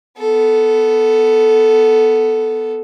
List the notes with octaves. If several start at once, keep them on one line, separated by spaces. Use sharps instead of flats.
B3 A4